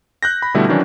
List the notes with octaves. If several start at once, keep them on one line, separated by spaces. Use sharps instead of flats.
F#6 G6 A#6
B5
B2 D3 G3 A3 E4
D#3 E3 F#3 C#4 D4